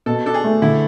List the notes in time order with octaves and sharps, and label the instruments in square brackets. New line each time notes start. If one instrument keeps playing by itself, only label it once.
[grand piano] B2 [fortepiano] A4
[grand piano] D4 [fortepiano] A4
[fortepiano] G#4
[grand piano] A3
[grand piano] D3 [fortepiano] E4